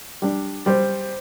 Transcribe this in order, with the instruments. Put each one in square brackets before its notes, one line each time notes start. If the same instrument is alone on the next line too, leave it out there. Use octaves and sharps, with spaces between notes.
[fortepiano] G3 D4
[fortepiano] G3 [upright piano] C5